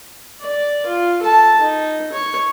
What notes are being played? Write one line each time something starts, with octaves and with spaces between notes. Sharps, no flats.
D5
F4
A4 A5
D#4
C#5